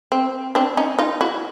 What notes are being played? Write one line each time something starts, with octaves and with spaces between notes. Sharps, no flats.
C4
C4 D4
C#4 D#4
D#4 F4
E4 F#4